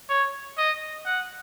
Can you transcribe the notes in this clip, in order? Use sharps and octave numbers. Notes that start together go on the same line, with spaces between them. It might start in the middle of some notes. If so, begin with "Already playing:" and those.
C#5
D#5
F#5